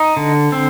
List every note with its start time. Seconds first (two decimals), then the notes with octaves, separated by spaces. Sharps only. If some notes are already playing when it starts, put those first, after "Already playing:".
Already playing: D#4
0.17 D3
0.52 C4